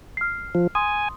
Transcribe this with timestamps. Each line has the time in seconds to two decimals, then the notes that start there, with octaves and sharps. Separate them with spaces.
0.17 F6 C7
0.55 F3
0.75 G#5 C6 D#6